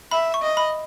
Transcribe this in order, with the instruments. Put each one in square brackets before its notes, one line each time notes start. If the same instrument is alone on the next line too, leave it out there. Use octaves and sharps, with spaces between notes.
[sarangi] E5 [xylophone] B5
[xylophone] C#6
[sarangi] D#5
[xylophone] B5